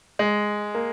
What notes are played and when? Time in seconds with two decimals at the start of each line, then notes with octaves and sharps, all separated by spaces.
0.19 G#3
0.75 A#3